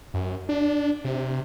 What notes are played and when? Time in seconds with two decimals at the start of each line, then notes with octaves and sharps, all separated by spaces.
0.14 F#2
0.49 D4
1.05 C3